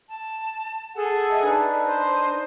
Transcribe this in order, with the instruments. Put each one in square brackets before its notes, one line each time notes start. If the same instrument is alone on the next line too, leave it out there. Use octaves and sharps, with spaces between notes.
[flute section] A5
[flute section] G#4 A4 F#5 [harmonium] A5
[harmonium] D#5 E5 G#5
D4 D#4 B4
[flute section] C5 D#5